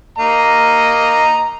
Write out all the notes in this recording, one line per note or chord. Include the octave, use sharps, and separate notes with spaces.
A#3 D#5 A#5